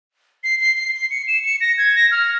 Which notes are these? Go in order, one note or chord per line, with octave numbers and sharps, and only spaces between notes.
C7
C7
C7
C7
C#7
E7
C#7
A#6
G#6
A#6
F6